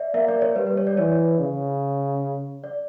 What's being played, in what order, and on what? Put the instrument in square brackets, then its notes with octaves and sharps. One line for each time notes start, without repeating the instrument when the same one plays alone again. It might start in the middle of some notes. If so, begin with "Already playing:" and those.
Already playing: [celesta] D5 E5
[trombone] A#3 [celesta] E5
[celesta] D5
C#5
[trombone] G3 [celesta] B4
[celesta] B4
C#5
D5
[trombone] E3 [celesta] C#5
[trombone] C#3
[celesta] D5